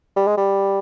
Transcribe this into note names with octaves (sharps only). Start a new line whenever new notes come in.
G3
G#3
G3